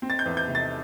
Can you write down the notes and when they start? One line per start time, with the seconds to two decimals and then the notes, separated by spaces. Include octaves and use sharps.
0.02 C4
0.10 A6
0.19 G6
0.26 E2
0.37 G6
0.48 C3
0.55 A6